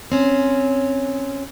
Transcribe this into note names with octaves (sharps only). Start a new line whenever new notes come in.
C4 C#4